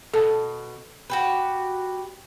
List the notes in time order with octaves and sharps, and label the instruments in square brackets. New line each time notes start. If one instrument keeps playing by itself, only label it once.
[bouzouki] B2 [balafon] A4 A5
[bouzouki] F#4 G4 B4